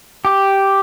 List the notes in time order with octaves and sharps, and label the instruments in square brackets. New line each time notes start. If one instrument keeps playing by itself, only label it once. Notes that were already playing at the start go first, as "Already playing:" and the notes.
[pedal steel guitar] G4